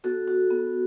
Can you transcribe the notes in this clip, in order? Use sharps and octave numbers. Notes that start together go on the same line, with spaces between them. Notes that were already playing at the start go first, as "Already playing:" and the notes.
B3 F#4 A4
F#4
B3